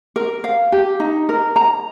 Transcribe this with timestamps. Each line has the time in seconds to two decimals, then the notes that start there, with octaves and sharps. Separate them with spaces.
0.16 A#4
0.44 F5
0.72 G4
1.00 D#4
1.29 A#4
1.56 A#5